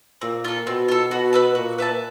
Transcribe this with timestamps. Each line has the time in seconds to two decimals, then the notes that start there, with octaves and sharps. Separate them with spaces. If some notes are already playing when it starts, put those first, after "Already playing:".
0.21 A#2 C4
0.44 F4 A4
0.67 B2 C4
0.88 F4 A4
1.11 B2 F#4
1.33 B4 E5 A5
1.55 A#2 F#4
1.78 B4 E5 A5